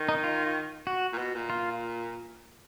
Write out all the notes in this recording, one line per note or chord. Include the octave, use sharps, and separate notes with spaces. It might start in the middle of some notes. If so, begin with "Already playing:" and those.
Already playing: D#3
D#4
F4
F#4
A#2
B2
A#2
F4